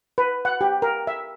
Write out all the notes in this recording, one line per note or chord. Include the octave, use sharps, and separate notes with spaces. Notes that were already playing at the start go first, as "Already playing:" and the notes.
B4
F#5
G4
A#4
E5